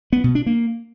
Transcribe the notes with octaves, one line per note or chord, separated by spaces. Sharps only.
B3
B2
D4
A#3